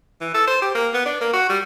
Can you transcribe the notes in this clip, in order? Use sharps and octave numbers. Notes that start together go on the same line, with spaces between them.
E3
A4
C5
G4
A#3
B3
D4
A#3
F#4
G3